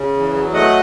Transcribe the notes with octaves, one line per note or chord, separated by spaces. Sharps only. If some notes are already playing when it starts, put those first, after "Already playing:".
Already playing: C#3
E2
F#3
A3 D#5 F#5